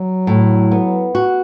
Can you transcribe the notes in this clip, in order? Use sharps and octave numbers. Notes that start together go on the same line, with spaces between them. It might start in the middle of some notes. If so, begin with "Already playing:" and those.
Already playing: F#3
A2
B3
F#4